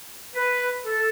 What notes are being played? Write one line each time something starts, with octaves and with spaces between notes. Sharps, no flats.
B4
A4